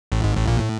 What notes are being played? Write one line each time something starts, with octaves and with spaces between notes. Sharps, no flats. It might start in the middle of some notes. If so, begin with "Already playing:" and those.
A1 A2
G#1 G#2
A1 A2
A#1 A#2
A2